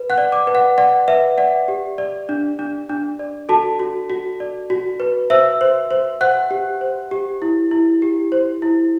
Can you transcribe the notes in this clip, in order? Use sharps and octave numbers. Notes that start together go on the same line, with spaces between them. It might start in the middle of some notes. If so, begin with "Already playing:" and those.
Already playing: B4
F#5 F#6
D5
D5 D6
B4
F#5
D5 F#5
B4 E5
D5 F#5
G4
D5
D4
D4
D4
D5
F#4 A4 A5
F#4
F#4
D5
F#4
B4
C5 E5 E6
C5
C5
C5 F#5 F#6
G4
C5
G4
E4
E4
G4
C5
E4